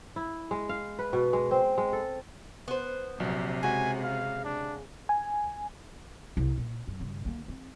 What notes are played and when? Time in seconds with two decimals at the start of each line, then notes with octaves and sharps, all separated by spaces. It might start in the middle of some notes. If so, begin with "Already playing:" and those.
0.16 E4
0.51 G#3
0.69 F5
0.99 B4
1.13 B2
1.33 G#3
1.51 C4
1.78 G#3
1.93 A4
2.68 B3 C5
3.20 A#1 C3 F#3
3.63 C#3 G#3 F#4 G#5
4.03 F5
4.44 D4
5.09 G#5
6.37 C2
6.58 A#2
6.87 F#2
7.00 G2 C#3
7.25 D3 A#3
7.48 C4